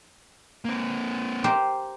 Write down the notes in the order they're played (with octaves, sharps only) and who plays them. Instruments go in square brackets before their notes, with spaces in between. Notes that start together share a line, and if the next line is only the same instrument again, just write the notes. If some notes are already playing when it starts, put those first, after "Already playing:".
[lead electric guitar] A#3 C4
[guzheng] G4 A#4 C5